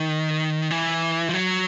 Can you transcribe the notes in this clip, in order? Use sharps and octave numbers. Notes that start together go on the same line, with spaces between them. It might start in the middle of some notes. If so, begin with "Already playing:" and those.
Already playing: D#3
E3
F3
F#3